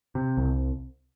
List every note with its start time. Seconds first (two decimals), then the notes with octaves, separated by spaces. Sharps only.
0.15 C3
0.37 C2